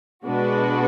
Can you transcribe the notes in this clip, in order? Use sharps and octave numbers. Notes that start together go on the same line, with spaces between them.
B2 G#3 D4 F#4 B4